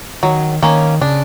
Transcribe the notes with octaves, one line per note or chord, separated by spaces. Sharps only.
D#3 F#3
D#3 A#3 C#4
C#3 D4